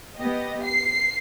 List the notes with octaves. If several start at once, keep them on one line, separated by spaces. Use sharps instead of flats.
B3 G4 D#5
C7